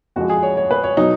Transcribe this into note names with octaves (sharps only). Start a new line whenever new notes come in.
F2 F3 G#3 F#4
G#4
C#5
C#5
B4
C#5
B2 F#3 D#4